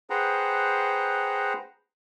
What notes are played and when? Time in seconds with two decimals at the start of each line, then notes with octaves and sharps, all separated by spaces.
0.10 G#4 B4 C5 F#5 G5 A#5